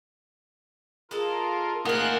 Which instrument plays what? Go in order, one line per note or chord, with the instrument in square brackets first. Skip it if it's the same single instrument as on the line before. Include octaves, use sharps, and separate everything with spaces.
[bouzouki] G#3 A4 [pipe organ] F4 A#4
[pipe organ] A3 G#4 F#6 [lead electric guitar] D#4 F#5 [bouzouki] F4 C5 [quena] A#4